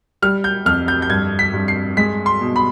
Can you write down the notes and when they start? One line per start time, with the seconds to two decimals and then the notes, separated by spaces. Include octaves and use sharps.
0.22 G3 F6
0.44 G6
0.66 F2 F6
0.88 G6
1.02 G6
1.10 G2 G#6
1.39 B6
1.54 G2
1.68 C7
1.97 G#3 B6
2.26 C6
2.41 B2
2.56 B5